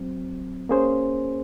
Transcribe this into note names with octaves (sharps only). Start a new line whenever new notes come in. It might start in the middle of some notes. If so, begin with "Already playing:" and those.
Already playing: F#3 C4
A#3 C#4 G#4 C5